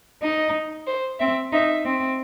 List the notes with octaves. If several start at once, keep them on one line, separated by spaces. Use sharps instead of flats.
D#4 D#5
C5
C4 E5
D#4 E5
C4